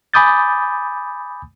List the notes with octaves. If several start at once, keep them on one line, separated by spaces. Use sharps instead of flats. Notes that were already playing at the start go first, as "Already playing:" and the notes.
G#5 B5 D6 D#6 G6 A6